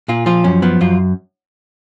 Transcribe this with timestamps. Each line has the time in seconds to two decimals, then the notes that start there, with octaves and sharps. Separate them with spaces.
0.08 A#2 F4
0.26 F3 F4
0.44 F#2 C#4
0.62 F3 B3
0.81 F#2 F4